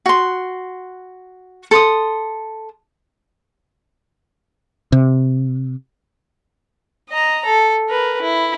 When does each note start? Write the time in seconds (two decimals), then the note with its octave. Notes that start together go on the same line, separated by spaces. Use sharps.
0.06 F#4 C6
1.71 A4 C6 D#6
4.92 C3
7.09 D#5 A#5
7.45 A4
7.89 A#4 B4
8.22 E4